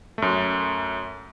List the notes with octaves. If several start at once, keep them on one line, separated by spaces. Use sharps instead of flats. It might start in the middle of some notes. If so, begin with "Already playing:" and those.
F#2 A3